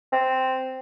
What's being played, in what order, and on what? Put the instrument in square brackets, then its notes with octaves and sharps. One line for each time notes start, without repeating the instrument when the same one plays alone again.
[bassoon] C4